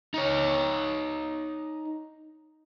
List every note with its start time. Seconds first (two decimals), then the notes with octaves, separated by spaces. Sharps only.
0.14 D#4 C#5